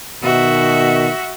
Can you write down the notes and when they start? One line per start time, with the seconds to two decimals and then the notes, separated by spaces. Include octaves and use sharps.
0.23 B2 D#3 F#4 E5